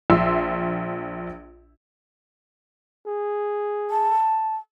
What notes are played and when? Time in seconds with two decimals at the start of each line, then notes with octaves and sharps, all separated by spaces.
0.10 A#1 E5 C6 E6
3.07 G#4
3.90 A5